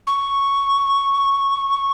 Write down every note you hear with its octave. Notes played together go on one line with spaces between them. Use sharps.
C#6